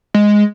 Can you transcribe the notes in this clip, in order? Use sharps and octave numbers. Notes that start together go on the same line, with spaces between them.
G#3